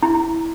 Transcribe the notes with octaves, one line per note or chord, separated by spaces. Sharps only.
E4